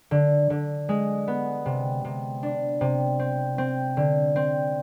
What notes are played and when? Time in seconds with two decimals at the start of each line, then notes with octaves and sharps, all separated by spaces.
0.11 D3
0.50 D3
0.89 G#3
1.28 B3
1.66 C3
2.05 C3
2.43 D4
2.81 C3
3.19 C4
3.58 C4
3.97 D3
4.36 C4